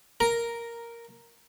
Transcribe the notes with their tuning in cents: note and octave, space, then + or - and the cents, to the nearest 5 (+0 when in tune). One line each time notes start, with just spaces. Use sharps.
A#4 +0 A#5 +5